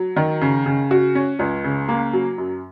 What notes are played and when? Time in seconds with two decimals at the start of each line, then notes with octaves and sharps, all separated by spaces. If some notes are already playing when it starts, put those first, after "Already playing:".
Already playing: F#3
0.16 D#3
0.41 C#3
0.66 C#3
0.91 F#4
1.15 C#4
1.39 C#2
1.64 C#3
1.89 A#3
2.13 F#3
2.38 F#2